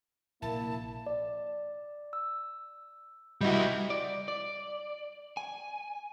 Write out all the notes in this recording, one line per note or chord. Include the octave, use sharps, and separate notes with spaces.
A#1 C3 A#3 E4 A5
D5
E6
G3 E4 F#4 D#5 F#5
D5
D5
G#5